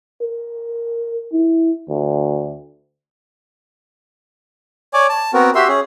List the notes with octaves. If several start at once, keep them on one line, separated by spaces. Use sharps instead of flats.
A#4
E4
D2
C#5 D5 G#5 D6
A5
B3 C4 F#4 A#4
F#4 G4 E5 C6
C#4 G#4